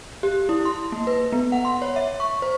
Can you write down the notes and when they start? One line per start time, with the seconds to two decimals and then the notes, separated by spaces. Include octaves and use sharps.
0.23 G4
0.49 E4
0.65 C6
0.92 A#3
1.07 B4
1.32 B3
1.52 F#5
1.65 C6
1.82 C#5
1.96 E5
2.20 C#6
2.42 C5